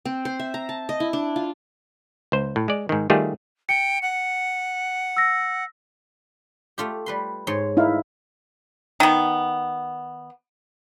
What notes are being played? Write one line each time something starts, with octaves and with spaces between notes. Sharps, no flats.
C4
C5
E5
A#5
A5
D#5
E4
D4
F4
C#2 C5
A2
G#3 D5
G#2 D#3
D#3 G3 A3 F4 G4 G#4
G5 C#7
F#5
E6 A#6
A3 F4 G4
G3 B4 C6
G#2 C#5 C6
D#4 E4 F5
D#3 B3